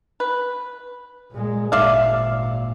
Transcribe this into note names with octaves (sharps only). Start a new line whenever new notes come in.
B4
A#2 G#3
G#1 A#2 D5 E5 F5